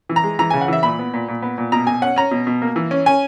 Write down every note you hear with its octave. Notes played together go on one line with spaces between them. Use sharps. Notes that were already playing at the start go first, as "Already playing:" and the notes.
E3
A#5
G#3
E3 A#5
C#3 G#5
F#5
E3 E5
A#2 B5
B3
A#2
A#2
B3
A#2
B2 A#5
B2 G#5
C#4 F#5
C#4 A#5
B2
B2
A#3
E3
C#4
C#4 G#5